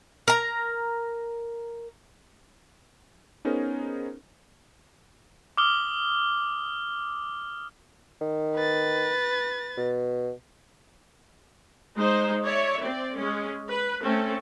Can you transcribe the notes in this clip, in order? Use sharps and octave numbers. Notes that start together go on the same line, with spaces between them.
A#4 A#5
B3 C#4 D#4 G#4 A#4 C5
D6 D#6 F6 G7
D#3
B4 A6
B2
G#3 D#4 C5
C#5 D5 E5
C4 D5
G#3 C#4
B4
A3 C4 C#4 A4